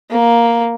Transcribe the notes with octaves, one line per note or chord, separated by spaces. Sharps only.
A#3